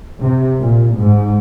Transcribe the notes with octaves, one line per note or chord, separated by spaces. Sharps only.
C3
A#2
G#2